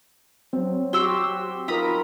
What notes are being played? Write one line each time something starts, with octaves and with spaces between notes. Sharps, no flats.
F#3 C4
F#4 G4 C6 E6
D#4 F4 A#4 A#5 B5 D#6